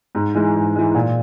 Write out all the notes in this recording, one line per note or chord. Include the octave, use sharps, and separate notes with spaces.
G#2
E3 G#3
G#2
E3 G#3
A#2